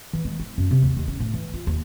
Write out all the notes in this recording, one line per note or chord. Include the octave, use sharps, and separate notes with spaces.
E3
G#3
E4
F#2
C3
D#2
D#2
C#4
A2
E3
F4
D#2